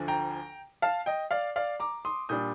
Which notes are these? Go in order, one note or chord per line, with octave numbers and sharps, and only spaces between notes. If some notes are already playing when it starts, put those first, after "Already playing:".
Already playing: D2 D3 F3
G5 A#5
F5 A5
D#5 G5
D5 F5
D5 F5
A#5 D6
C6 D#6
A#2 G3 D4 D#6 G6